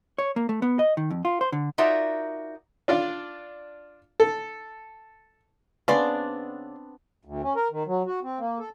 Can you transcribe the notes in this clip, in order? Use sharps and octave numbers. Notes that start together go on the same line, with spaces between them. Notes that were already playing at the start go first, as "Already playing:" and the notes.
C#5
A#3
A3
B3
D#5
D#3
F2
F4
C5
D3
D#4 F4 F#4 A#4 D5 E5
D4 F4 D5 F5
A4
C#3 B3 C4 D4 D5 C6
D2
C#4
A#4
D#3
F#3
F#4
C4
A#3
A4